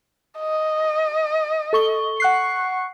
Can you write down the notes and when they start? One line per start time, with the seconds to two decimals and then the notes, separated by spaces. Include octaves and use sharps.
0.39 D#5
1.73 A4 C#6 G7
2.20 F#5 C#6 F#6 C7